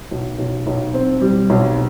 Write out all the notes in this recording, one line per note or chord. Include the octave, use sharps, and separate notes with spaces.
B1
B1
B1
C4
G3
B1